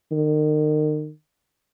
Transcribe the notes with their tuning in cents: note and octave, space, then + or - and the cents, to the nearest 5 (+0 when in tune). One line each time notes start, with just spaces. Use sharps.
D#3 -35